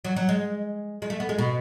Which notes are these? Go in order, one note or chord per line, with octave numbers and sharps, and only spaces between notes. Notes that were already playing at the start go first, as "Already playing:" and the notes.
F#3
F#3
G#3
G#3
A3
B3
G#3
B2